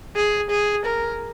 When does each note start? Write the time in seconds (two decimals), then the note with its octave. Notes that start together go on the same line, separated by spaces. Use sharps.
0.16 G#4
0.50 G#4
0.85 A#4